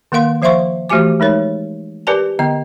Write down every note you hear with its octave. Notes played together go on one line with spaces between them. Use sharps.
D#3 A#3 A#4 F5 C6
F3 C5 E5 F5 C6 C#6
E3 A3 F#4 G4 G#5 D6
G#3 D#4 A#4 C#5
G4 A#4 B4 D5 G#5 A5
D3 B3 D#5